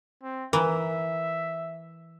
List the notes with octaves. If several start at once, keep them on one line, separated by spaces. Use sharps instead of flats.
C4
E3 A#4 E5